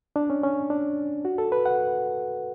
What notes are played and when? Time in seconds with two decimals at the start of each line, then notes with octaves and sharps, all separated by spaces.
0.16 D4
0.30 C#4
0.43 C#4
0.70 D4
1.25 F#4
1.38 A4
1.52 B4
1.66 F#5